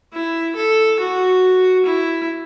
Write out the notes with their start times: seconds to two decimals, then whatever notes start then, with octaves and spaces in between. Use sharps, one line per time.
0.13 E4
0.56 A4
0.99 F#4
1.86 E4